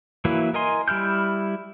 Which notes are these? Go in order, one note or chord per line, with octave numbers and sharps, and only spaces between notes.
E3 F#3 A#3 E4
A#4 D#5 G#5 C6
G3 E4 F6 G6